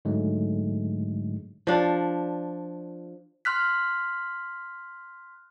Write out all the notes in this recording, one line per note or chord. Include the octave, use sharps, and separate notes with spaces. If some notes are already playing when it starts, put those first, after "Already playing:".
G#2 D3 F#3 G#3 A3
F3 D4
C6 F6 F#6 B6